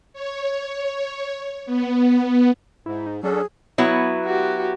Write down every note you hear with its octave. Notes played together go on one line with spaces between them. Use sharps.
C#5
B3
G#2 E4
D#4
F#3 C#4 D4 G#4 A4
F#3 B3 E4
F#4 G4